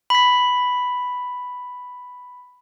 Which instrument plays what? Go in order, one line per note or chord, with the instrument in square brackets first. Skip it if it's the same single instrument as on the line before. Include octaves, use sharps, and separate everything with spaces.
[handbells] B5 B6